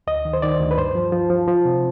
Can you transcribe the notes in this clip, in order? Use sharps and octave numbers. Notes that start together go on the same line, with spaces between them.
D2 D#5
D#3
C5
D#3 D5
D2
B4
G2 C5
F3
F3
F3
F3
C3